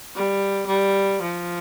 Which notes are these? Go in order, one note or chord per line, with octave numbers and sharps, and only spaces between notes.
G3
G3
F3